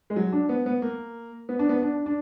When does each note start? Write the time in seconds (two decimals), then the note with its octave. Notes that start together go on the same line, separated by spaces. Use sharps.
0.10 G#3
0.16 F#3
0.32 D4
0.49 B3
0.66 B3
0.82 A#3
1.49 B3
1.59 D4
1.69 B3
1.82 D4
2.06 D4